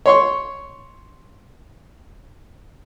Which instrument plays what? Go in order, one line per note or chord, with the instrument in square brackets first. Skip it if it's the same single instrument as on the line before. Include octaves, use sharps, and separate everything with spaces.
[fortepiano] C#5 C6 C#6